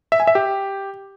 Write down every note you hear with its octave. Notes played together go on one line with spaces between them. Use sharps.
E5
G#5
E5
G4